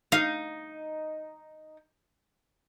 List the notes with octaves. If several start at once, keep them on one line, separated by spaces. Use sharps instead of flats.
D#4 F5